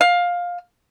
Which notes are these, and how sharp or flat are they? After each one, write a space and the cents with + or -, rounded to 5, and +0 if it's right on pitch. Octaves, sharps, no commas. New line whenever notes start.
F5 +15